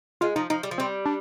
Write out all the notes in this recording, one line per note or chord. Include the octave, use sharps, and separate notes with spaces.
G#3 F4
F3 D#4
F3 D#4
G3
F3
G3 C4
D4